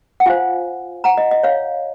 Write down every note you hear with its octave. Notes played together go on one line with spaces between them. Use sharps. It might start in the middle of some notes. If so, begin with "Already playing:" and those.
F#5
F4 C5 F5 G#5
F#5 A#5
D#5
D#5
C#5 F5